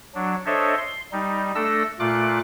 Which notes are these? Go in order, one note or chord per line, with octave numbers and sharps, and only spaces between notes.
F#3 D4
D4 A4 C5 C#5 D#5 E5
C6
G3 D#4
A3 D4 A4 E6 A#6
A#2 A3 F4 D6 F#6